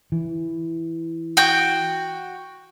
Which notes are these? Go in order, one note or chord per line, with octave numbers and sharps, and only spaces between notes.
E3
F#4 G5